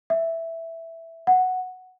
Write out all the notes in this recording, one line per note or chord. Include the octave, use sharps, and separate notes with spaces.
E5
F#5